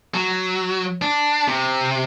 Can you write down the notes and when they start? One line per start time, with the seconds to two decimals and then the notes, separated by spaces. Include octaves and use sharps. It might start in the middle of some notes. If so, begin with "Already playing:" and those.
0.14 F#3
1.02 D4
1.48 C3